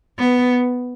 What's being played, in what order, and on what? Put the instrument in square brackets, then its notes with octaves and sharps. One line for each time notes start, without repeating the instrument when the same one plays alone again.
[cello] B3